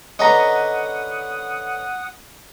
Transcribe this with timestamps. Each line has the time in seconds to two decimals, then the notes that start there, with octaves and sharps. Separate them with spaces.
0.19 D3 C#4 B4 D#5 F#5 A#5 D#6